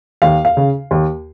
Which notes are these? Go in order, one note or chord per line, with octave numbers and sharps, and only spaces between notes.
D#2 F5
F5
C#3
D#2